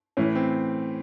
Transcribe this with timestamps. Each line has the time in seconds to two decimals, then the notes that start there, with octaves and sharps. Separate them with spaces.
0.17 A2 E3 C#4
0.35 C4